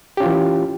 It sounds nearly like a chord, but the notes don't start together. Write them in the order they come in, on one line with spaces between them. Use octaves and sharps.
G4 C#4 F4 E3